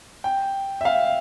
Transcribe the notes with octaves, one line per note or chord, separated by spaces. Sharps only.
G5
E5
F5